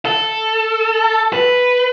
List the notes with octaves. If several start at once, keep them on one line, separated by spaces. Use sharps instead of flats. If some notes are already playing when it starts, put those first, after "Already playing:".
A4
B4